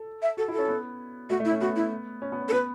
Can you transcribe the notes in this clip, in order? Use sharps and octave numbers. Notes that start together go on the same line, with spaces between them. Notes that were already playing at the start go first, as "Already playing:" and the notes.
Already playing: A4
E5
F#4 A4
E4
A4
C#4
B3
A3 F#4
A3
E4
C#4
B3 F#4
E4
C#4
B3
C#4
A4
B3 B4